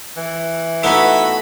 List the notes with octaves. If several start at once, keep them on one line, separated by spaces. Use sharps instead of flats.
E3
A3 B3 D#4 E4 F#4 B5